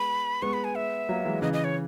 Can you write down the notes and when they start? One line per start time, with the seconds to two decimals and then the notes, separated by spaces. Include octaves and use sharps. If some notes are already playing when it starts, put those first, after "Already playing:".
Already playing: G#3 B3 B5
0.42 G#3 B3 C#6
0.53 B5
0.64 G#5
0.75 E5
1.09 F#3 A#3
1.25 E3 G#3
1.42 C#3 E3 D#5
1.53 D#5
1.64 C#5